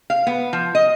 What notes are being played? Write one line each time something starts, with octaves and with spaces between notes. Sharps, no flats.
F5
B3
F3
D#5